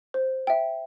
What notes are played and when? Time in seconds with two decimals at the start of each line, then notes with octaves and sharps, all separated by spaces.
0.14 C5
0.47 E5 G5